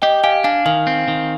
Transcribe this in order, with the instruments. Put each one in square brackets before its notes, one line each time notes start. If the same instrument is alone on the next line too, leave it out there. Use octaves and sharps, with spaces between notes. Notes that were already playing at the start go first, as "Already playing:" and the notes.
[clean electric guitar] G4 [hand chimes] D#5 G5
[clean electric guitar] G4 [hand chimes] F5 G#5
[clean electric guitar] D4 [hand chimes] F5 G#5
[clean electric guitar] D#3 [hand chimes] F5 G#5
[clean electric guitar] C4
D#3